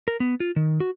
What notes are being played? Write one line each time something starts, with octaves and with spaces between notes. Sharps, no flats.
A#4
B3
F4
D#3
F#4